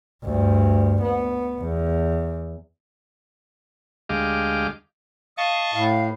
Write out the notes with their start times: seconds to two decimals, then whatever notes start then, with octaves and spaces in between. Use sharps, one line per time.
0.24 D2 G2
1.01 B3
1.61 E2
4.09 D2 G#3 G4 D#5 F5 D6
5.38 D#5 F5 A5 C#6
5.74 A2 F5